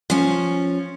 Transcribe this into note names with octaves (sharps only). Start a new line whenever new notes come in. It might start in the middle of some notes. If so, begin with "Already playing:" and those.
F3 C#4